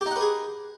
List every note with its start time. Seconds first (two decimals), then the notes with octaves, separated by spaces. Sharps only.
0.01 G4
0.06 D#4
0.11 F#5
0.16 B4
0.21 G#4